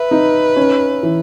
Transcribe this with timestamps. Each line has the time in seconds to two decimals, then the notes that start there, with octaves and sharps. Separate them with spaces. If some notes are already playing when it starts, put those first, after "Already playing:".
Already playing: B4 E5
0.11 D#4
0.56 C#4
1.03 E3